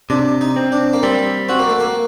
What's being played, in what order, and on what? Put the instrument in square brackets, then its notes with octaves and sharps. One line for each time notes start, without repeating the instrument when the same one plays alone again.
[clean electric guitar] C3 [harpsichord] D4
[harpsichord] D#4
[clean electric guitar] C4
[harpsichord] D4
A#3
[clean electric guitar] G3 [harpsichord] C4
[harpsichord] C4 [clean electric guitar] F#4
[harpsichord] A#3
A3
A#3